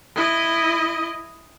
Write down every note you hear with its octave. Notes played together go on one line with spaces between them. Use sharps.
E4 D#5